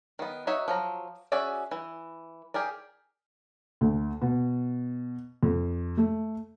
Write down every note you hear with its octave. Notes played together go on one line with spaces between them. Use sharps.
D#3 B3
D#4 F#4 C#5 E5
F3 F#3 A#5
C#4 F#4 G#4 D5 E5
E3
G4 G#4 A#4 D5
D2
B2
F2
A3